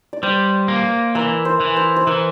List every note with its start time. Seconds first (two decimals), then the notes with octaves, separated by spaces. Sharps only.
0.13 D5
0.23 G3 C5
0.68 A#3
1.15 E3 A#4
1.45 C5
1.60 E3
1.77 C5
1.96 C5
2.07 E3 A#4